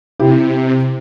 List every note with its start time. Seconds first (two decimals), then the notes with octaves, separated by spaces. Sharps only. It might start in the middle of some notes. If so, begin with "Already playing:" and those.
0.20 C3 E4 G4